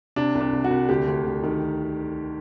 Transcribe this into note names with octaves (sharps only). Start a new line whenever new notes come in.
C3 D4
C2
D4
C2
F#4
C2
D2 G4
D2
D2
D#3